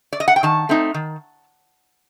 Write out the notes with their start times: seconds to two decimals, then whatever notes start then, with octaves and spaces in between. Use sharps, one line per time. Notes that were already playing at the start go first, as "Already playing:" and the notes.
0.13 D5
0.20 D#5
0.28 F#5
0.36 G5
0.43 D#3 A5
0.69 A3 C4 D#4
0.94 D#3